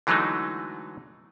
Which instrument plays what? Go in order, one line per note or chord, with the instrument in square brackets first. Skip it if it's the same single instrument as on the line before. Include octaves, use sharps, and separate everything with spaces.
[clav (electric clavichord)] D3 E3 F#3 G#3 A3 D#4